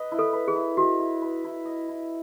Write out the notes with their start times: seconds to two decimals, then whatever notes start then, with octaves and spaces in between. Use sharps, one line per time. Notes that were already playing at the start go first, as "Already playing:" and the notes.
Already playing: B4 D#5
0.12 E4
0.19 A4
0.33 B4
0.48 G#4
0.55 E4
0.77 F#4 D#5
0.99 E4
1.22 B4
1.44 E4
1.65 D#5
1.89 E4